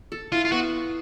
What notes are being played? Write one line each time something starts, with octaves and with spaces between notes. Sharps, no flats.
A4
E4 F4
F4
B3 F#4